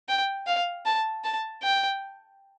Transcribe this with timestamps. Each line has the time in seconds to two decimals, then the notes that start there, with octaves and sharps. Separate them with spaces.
0.09 G5
0.47 F5
0.86 A5
1.24 A5
1.63 G5